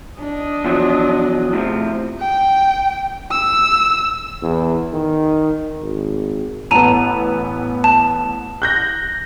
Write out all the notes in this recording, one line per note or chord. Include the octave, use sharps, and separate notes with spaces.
D4 D#5
E2 F3 F#3
A2 C3 F3
G5
E6
E2
D#3
G#1
A1 B3 A5 A#5 D#7
A5
F#6 G6 A#6